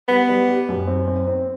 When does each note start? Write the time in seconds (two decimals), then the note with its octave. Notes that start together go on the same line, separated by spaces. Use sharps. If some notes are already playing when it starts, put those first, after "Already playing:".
0.08 G3 B3
0.29 G3
0.49 G4
0.69 F#2
0.87 C4
1.07 C4
1.27 C4